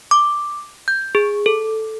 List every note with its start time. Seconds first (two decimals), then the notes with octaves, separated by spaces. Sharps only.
0.11 D6
0.88 G6
1.15 G#4
1.46 A4